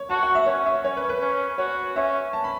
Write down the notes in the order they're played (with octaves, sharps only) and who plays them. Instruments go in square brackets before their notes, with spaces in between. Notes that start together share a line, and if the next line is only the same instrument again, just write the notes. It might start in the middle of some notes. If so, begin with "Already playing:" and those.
Already playing: [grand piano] C#5
[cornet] F#4 [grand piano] A5
[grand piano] F#5
E5
[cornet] C#4 [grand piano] C#5
[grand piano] E5
[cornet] C#4 [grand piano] C#5
[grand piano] B4
B4
[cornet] C#4
[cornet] F#4 [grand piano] C#5
[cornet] C#4 [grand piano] E5
[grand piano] A5
B5